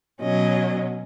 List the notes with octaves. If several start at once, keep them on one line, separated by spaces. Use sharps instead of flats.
B2 F#3 C#4 D#5